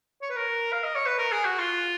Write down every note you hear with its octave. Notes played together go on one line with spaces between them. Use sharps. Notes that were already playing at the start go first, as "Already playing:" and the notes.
C#5
B4
A#4
F5
D#5
C#5
B4
A#4
G#4
F#4
F4